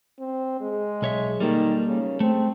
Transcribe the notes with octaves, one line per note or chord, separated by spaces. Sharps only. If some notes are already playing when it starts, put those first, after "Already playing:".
C4
G#3
B1 C#5 E5
D#3 G3 A#3 A4
C#3
A3 C4